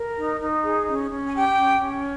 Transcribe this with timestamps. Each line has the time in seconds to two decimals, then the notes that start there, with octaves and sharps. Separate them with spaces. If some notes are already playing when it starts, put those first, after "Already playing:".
Already playing: A#4
0.17 D#4
0.40 D#4
0.64 G#4
0.87 C#4
1.10 C#4
1.25 G#5
1.34 G4 G5
1.57 C#4
1.81 C#4